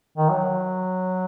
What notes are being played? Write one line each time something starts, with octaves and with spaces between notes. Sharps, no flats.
D#3
F#3